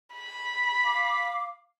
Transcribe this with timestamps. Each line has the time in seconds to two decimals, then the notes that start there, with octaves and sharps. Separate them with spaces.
0.15 B5
0.84 F5 D6